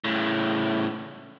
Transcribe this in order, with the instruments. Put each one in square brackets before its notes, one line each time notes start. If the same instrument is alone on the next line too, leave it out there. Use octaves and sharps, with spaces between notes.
[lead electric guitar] A2 C#3